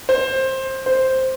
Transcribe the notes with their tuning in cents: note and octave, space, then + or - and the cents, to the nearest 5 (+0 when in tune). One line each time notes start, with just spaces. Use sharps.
C5 +15
C5 +0